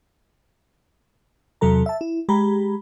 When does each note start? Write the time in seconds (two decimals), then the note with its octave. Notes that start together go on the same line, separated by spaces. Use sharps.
1.61 E2 C3 F#3 A4 A#5
1.86 E5 A5
2.01 E4
2.29 G#3 G4 A#5 B5